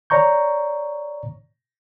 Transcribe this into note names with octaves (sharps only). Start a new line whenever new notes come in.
C#5 D5 A#5 C#6 G6